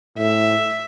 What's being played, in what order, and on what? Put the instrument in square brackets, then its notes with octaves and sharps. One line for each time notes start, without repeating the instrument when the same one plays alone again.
[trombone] A2 [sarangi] E5